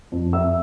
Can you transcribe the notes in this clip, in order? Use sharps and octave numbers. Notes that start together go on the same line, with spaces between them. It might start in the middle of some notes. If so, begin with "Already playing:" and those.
F2
F2 E5 E6